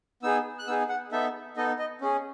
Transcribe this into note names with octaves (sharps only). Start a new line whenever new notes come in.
B3 D#4 G#4 E6
F#6
B3 D#4 G#4 E6
F#5
B3 D#4 A4 E5
B3 D#4 A4 D#5
D#5
C#4 G#4